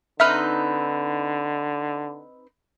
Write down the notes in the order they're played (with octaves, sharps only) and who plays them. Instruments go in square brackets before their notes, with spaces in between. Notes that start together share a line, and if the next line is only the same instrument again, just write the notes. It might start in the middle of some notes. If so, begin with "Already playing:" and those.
[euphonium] D3 [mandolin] C4 D#4 B4 [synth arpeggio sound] E5 F6